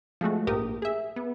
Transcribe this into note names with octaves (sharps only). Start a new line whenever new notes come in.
F3 G#3 A3 F#4
A#1 G#2 G4 A#4 D#6
G#4 E5
B3